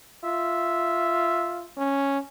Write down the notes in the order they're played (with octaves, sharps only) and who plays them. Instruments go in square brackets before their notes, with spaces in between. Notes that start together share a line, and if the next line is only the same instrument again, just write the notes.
[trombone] F4 [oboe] E5
[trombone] C#4